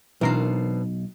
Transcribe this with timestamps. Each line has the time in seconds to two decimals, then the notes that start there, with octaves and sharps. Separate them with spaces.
0.21 B1 B2 E3 C4 D4 A#4 C7